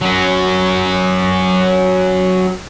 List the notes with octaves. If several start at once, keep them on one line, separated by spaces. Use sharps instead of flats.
F#3 C#4